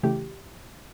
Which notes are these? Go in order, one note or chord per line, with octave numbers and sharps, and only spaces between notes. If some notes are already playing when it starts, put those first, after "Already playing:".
C#3 E3 A3 G4